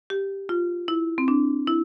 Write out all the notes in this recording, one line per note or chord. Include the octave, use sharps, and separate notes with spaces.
G4
F4
E4
C4
D4
E4